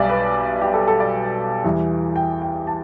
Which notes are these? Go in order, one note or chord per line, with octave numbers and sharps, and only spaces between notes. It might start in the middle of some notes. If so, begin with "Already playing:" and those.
Already playing: B1 B2 G3 D5 E5
B4
G4
A4
A4
D5
E2 E3 G3
G5
G5
A5